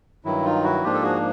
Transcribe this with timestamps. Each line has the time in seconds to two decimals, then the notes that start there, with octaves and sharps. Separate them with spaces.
0.25 G2 D#3 F#3 E4
0.44 D#4 F4
0.64 E4 F#4
0.83 G#2 F3 A#3 D4 F4 G4
0.94 A4
1.03 F#4 G#4